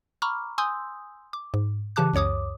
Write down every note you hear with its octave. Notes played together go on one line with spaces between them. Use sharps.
A#5 B5 C#6 D6 F6
G#5 C6 D#6 E6 G6
D6
G#2
C#3 E3 G4 A5 D6 F#6
C#2 F#2 C#5 D6 D#6